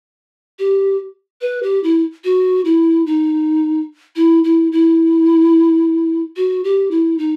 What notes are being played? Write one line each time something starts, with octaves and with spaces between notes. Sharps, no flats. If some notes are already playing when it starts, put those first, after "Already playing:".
G4
B4
G4
E4
F#4
E4
D#4
E4
E4
E4
F#4
G4
E4
D#4